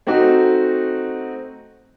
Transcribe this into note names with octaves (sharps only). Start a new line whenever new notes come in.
A3 C4 D#4 F#4